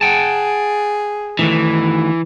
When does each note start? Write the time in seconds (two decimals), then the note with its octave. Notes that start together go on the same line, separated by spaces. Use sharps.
0.01 G#4 F#5 G5 A5
1.39 D#3 E3 A3 D#4